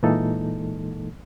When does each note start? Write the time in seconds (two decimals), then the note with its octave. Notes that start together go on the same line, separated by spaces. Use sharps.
0.03 A#2 E3 G#3 A#3 D#4 A4